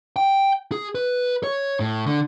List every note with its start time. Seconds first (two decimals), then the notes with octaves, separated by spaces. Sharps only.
0.16 G5
0.72 G#4
0.95 B4
1.44 C#5
1.80 A2
2.06 D3